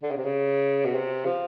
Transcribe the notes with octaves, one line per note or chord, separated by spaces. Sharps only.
D3
C#3
C3
C#3
B2
C3
F3